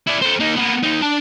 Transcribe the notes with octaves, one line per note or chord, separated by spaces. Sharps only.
E4 D5
A4 C5
A#3 D#4
A#3 B3
D#2 D#4
D4 A5